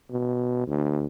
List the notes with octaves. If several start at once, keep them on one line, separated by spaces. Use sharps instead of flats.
B2
D2